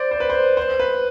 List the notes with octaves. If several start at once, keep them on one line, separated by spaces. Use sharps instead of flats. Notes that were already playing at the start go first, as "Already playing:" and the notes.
Already playing: C5 D5
C5
B4
C5
C5
B4